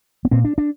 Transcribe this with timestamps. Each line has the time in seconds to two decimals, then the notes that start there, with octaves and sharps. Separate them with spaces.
0.25 B3
0.31 A#2 C4
0.45 D4
0.58 D4